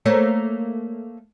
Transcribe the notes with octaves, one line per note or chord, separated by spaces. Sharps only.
A3 A#3 C#5